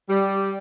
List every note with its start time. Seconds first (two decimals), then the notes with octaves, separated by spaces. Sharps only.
0.10 G3